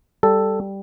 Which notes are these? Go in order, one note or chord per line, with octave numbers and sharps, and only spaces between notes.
G3 A4